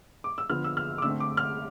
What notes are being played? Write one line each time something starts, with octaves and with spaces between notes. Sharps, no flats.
D6
E6
D3 F3 B3 F6
E6
F6
D6
D3 A3 C4 E6
D6
F6